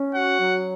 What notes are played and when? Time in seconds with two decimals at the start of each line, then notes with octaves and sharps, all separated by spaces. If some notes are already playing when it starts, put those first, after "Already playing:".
Already playing: C#4
0.15 F#4 F#5
0.38 F#3